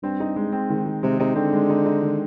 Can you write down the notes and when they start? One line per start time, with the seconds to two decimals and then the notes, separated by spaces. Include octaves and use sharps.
0.03 G2 C4
0.20 D#4
0.36 G#3
0.52 C4
0.70 G#2 D#3
0.86 D#3
1.03 C3 G#3
1.20 C3 D#4
1.36 D3 C4
1.53 G#3
1.70 D#4
1.86 D#4
2.02 D#3